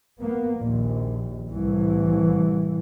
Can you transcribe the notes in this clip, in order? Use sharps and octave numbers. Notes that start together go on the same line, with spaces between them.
A#3 B3
A#1 D#2 A#2
C2 A2 E3